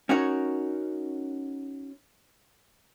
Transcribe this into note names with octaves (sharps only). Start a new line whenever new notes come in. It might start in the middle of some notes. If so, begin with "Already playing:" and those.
C#4 D#4 F#4 A#4 C#5